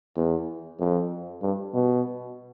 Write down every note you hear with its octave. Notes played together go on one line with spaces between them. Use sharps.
E2
F2
G2
B2